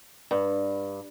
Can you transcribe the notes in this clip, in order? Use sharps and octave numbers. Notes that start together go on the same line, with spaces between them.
G2